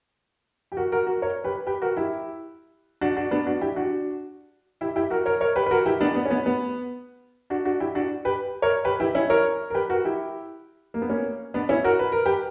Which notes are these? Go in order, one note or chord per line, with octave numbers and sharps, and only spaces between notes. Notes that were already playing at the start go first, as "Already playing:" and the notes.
G4
F#4 A#4
F#4 A#4
F#4 A#4
A#4 C#5
G4 B4
G4 B4
F#4 A#4
E4 G4
D4 F#4
D4 F#4
B3 D4
D4 F#4
E4 G4
D4 F#4
E4 G4
E4 G4
F#4 A#4
A#4 C#5
A#4 C#5
G4 B4
B4
F#4 A#4
E4 G4
B3 D4
B3
C#4
B3
B3
D4 F#4
D4 F#4
E4 G4
D4 F#4
G4 B4
A#4 C#5
G4 B4
E4 G4
C#4 E4
A#4 C#5
A#4
G4 B4
F#4 A#4
E4 G4
A#3
B3
A#3 C#4
B3 D4
C#4 E4
F#4 A#4
B4
A#4
G4 B4